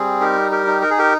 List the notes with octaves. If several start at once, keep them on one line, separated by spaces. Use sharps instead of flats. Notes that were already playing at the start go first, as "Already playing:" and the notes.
Already playing: G3 C4 G#4
D#4 G4 A#4
G4 A#4
D#4
A#4
G#4
G4 A#4